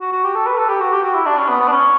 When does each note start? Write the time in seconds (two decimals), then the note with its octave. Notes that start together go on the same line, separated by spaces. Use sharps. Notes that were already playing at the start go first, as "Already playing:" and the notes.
0.01 F#4
0.12 F#4
0.24 G4
0.35 A4
0.46 B4
0.58 A4
0.69 G4
0.80 F#4
0.93 G4
1.03 F#4
1.15 E4
1.26 D4
1.37 C#4
1.49 B3
1.61 B3
1.68 D4
1.72 C#4